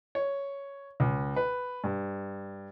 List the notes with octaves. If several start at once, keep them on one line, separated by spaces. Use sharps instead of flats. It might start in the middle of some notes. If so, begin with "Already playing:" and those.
C#5
C#2
B4
G2